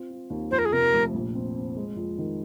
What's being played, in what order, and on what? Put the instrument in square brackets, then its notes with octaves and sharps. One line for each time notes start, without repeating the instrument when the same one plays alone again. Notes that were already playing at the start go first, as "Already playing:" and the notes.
Already playing: [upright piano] C4 F4
F4
D#2
[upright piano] F2 [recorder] C5
[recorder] A#4
G#4
[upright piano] C3 [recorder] A#4
[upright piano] F1
A#1
C4
C4
G#3
F2
D#3